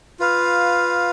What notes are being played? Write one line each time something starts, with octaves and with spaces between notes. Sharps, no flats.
F4 B4 F5